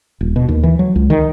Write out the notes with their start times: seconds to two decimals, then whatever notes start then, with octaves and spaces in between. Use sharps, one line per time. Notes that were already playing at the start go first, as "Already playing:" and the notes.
0.21 D#1
0.36 B2
0.48 D#2
0.63 E3
0.79 F#3
0.96 C#2
1.10 D#3